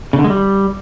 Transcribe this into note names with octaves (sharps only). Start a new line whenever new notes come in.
C#3
D3
G#3
G3